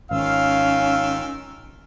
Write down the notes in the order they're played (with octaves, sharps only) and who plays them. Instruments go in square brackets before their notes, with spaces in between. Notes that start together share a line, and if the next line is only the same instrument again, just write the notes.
[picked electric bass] G#1 [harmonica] D#3 F4 E6 [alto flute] C#4 [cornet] F5